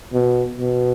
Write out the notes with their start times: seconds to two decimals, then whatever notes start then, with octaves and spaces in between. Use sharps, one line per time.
0.13 B2
0.57 B2